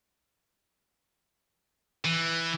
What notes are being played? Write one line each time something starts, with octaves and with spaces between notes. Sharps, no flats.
E3